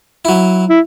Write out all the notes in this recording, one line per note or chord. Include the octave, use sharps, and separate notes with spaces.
F#3 E4
E4